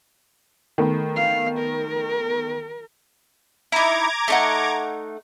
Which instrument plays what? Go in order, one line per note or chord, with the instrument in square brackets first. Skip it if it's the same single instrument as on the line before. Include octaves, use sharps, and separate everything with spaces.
[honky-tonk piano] D#3 A3 B3
[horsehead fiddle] F5
A#4
[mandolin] D#4 E4 [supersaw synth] A#5 D6 G#6
[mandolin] A3 D#4 F#5